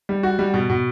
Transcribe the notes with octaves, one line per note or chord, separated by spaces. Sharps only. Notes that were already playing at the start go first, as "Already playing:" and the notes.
G3
F#4
G3
B2
B2